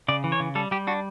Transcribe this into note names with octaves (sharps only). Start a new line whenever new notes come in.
C#3 D5
E3
C#5
C#3
G3 A4
G3 G4
D4 F#4